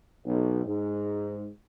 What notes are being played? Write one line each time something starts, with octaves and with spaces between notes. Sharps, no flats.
B1
G#2